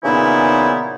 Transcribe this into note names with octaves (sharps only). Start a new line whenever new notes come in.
A#2 C#3 E3 B3 D#4 E4